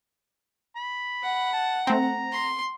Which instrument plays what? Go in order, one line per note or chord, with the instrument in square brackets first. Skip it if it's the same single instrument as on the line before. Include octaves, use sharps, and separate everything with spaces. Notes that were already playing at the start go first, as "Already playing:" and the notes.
[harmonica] B5
[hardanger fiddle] F#5
[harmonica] A5
[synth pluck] A3 C4 [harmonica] A#5
[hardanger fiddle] C6